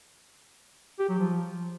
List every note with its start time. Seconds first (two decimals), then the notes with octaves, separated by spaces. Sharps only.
0.99 G4
1.09 F#3
1.19 F3